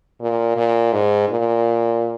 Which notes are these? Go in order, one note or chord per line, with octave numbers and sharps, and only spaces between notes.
A#2
A#2
G#2
A#2